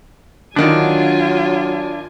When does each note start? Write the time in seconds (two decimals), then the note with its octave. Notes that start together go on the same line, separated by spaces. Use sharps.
0.56 D3 D#3 F#3 D4 F4 G#5